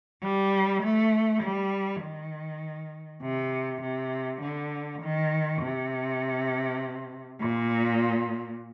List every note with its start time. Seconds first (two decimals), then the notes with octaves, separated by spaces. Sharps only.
0.22 G3
0.83 A3
1.42 G3
2.02 D#3
3.22 C3
3.82 C3
4.42 D3
5.02 D#3
5.61 C3
7.41 A#2